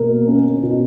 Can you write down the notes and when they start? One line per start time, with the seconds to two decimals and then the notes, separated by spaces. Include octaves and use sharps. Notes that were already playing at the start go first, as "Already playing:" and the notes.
Already playing: B2 A#3 A#4
0.28 C#4
0.63 B2